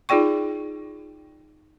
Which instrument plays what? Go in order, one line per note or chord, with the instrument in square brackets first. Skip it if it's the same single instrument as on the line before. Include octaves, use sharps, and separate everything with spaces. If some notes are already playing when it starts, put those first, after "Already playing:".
[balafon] D#4 F4 G#4 D5 G5 C#6